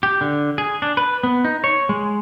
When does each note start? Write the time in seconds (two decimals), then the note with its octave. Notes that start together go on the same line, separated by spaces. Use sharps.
0.03 G4
0.21 D3
0.58 G#4
0.82 D4
0.97 B4
1.23 B3
1.45 D#4
1.64 C#5
1.89 G#3